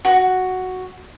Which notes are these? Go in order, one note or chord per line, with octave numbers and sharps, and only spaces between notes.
F#4